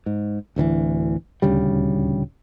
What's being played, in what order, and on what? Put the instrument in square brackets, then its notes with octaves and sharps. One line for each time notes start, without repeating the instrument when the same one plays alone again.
[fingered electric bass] G#2
D1 D2 D#3 E3
D#1 D2 C#3 G3